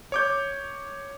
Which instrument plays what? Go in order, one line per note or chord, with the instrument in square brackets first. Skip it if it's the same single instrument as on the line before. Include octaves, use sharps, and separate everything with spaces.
[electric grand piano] C#5 D6 G6